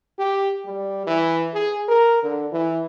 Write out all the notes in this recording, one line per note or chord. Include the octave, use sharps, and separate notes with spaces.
G4
G3
E3
G#4
A#4
D3
E3